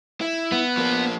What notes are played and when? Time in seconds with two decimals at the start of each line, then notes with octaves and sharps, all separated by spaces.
0.21 E4
0.52 B3
0.77 F3 A#3